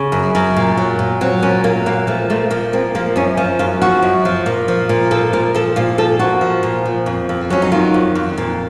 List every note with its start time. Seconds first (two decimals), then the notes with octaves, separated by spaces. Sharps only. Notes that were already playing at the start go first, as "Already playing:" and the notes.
Already playing: C#3
0.12 F#2
0.35 F#2
0.57 A#2
0.77 F#3
0.99 A#2
1.21 F#3 C4
1.42 A#2 C#4
1.64 F#3 A#3
1.86 A#2 A#3
2.07 F3 A3
2.30 A#2 A3
2.50 F3 A#3
2.73 A#2 C4
2.95 F3 A#3
3.16 F#2 C#4
3.37 F3 C#4
3.59 F#2 F4
3.82 F3 F#4
4.02 F#2
4.25 F3
4.46 A#2
4.68 F3
4.89 A#2
5.11 F3 A4
5.33 A#2 A#4
5.54 F3 A4
5.76 A#2 F4
5.98 F3 A4
6.19 A#2 F#4
6.41 F3
6.63 A#2
6.85 F3
7.06 F2
7.29 F2
7.50 F#3 C#4
7.62 D#4
7.72 D#3 F4
7.94 F2
8.15 F2
8.38 A#2